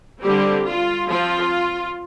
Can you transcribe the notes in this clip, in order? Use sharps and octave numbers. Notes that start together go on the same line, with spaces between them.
D3 G3 C4 G4
F4
F3 C4 F4